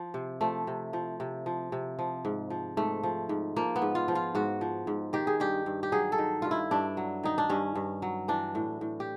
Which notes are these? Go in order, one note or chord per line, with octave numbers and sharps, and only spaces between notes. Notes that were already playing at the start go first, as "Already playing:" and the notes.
Already playing: F3
C3
F3 A3
C3
F3
C3
F3
C3
F3
G#2
F3
G#2 A3
F3
G#2
F3 A#3
B3
G#2
F4
F3
F4
G#2 F#4
F3
G#2
D#3 G4
G#4
G2 G4
G2
G4
F#3 G#4
A4
D#3
G2 F4
E4
G2 D4
F#3
D#3 D#4
D4
G2 C#4
G2
F#3
E3 D4
A2
A2
G4